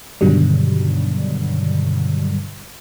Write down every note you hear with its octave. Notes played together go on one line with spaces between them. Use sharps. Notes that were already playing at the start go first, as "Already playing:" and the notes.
G2 B2 D3 D#3 F#3 G3